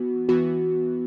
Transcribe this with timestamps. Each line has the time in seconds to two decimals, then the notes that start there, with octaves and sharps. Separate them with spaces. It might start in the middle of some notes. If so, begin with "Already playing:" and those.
Already playing: E3 B3 F#4
0.29 E3 B3 F#4